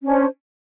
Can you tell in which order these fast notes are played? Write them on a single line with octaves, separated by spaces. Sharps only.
C#4 D4 C5